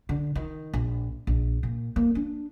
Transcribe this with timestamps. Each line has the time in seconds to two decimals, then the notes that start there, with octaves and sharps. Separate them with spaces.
0.09 D3
0.35 D#3
0.74 A#1
1.27 A#1
1.63 A#2
1.96 A#3
2.15 D4